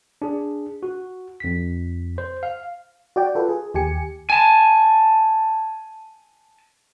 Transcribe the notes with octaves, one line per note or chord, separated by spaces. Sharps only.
D4 G#4
F#4
F2 B6
C5
F5
F#4 D5 G5
F4 A4 B4
G#4
D#2 G4 G#5 C#7
G#5 A5